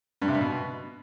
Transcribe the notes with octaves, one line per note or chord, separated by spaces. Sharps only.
G2
C3
G2
B2